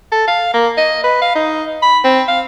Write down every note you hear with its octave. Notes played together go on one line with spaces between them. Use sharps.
A4
F5
A#3
D#5
B4
F5
D#4
B5
C4
F5